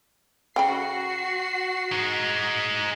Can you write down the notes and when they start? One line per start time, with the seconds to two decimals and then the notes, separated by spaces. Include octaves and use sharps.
0.56 C#3 F#4 G5 B5 C7
1.92 G#3 D#4